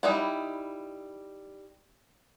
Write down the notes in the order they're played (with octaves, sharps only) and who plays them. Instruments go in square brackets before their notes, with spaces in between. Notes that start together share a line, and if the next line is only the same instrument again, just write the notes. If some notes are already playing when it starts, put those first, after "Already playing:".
[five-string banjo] G3 D#4 E4 D5 F#5